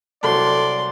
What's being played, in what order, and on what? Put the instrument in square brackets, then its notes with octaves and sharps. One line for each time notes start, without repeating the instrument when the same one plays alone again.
[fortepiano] C2 F#3 [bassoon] A4 [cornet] D5 [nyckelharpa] C6